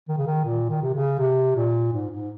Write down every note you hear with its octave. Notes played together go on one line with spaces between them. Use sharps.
D#3
C#3
D#3
A#2
D#3
C3
C#3
C3
A#2
G#2
G#2